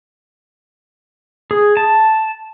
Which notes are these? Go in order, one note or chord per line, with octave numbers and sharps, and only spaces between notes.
G#4
A5